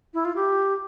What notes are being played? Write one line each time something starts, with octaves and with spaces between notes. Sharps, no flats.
E4
F4
G4